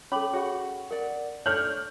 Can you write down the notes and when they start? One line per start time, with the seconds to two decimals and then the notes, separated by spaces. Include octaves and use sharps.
0.12 C#4 A4 C#5 B5 D6 F#7
0.34 F#4 G#4 C#5 F#5
0.91 A#4 D5 F#5
1.46 D4 A4 C#5 F6 G6 F#7